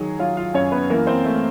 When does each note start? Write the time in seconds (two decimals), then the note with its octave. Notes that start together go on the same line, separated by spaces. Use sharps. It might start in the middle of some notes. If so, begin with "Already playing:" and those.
Already playing: D#3 F#3 G#4
0.19 F#3 F4 F5
0.37 F4 F5
0.54 F#2 C#4 C#5
0.72 B3 B4
0.90 E3 A#3 A#4
1.07 C4 C5
1.25 A3